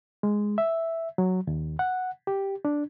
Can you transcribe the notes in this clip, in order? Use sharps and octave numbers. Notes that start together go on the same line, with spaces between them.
G#3
E5
F#3
D#2
F#5
G4
D4